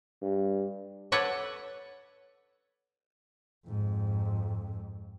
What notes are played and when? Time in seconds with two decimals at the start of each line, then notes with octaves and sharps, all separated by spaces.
0.22 G2
1.12 A4 B4 C#5 D5 F#5
3.67 F2 G#2